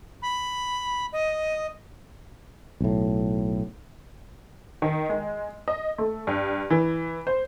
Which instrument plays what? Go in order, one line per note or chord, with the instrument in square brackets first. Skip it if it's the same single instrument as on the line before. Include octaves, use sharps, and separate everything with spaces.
[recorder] B5
D#5
[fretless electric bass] B1 A2
[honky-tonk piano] D#3
G#3
D#5
A3
G2
E3
C5